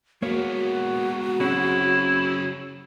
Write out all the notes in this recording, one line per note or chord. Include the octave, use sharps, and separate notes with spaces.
G#3 A#3 B3 F#4 C#5
C#3 F#3 C4 C#4 E4 G#4